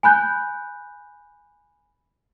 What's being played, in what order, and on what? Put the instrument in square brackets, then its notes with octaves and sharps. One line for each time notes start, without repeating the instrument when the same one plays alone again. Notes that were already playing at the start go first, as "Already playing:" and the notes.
[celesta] G#5 B5 F#6 G6